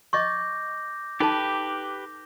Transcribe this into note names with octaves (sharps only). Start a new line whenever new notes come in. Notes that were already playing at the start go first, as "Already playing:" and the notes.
D#5 C#6 D6 G6 A#6
D#4 G4 A4 B4 A5